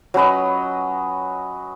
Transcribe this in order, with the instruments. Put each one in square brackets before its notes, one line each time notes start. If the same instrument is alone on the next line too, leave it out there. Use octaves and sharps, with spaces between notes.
[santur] F#3 C#4 B4 D#5